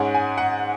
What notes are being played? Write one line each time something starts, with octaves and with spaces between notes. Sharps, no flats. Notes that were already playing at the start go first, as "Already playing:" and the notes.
Already playing: G#2 G#3 C#4 F#5
G#5
F#5